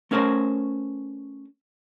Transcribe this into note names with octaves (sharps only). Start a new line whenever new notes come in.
A3 C#4 A#4 C5 C#5